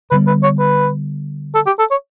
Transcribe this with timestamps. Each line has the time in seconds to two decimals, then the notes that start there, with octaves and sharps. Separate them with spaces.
0.11 D3 G3 B3 B4
0.27 B4
0.43 C#5
0.59 B4
1.55 A4
1.66 G4
1.79 A4
1.91 C#5